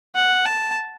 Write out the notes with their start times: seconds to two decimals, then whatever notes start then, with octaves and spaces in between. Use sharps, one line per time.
0.15 F#5
0.45 A5